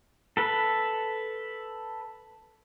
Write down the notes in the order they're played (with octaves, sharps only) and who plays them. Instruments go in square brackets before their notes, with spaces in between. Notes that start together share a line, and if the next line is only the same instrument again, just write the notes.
[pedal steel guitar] A4 B4